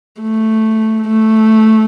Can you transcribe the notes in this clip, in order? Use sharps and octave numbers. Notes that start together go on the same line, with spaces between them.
A3
A3